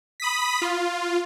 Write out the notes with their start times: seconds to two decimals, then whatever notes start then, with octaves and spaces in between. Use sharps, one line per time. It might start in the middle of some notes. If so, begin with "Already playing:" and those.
0.20 B5 D#6 B6
0.62 F4